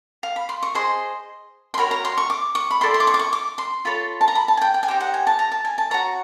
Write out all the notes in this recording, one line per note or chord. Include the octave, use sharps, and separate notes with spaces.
F5
B5
C6
C#6
G#4 C5 D#5 C6
C6
F#4 A#4 C#5 B5
A#5
C6
C#6
D6
C#6
B5
E4 A4 D5 C6
C6
D6
C#6
D6
C#6
D6
C6
F4 A4 C#5 B5
A5
A#5
B5
A5
G#5
G5
G5
G#5
D#4 G4 C5 G5
F#5
G#5
A5
A#5
A5
G#5
A5
F#4 A4 C#5 A#5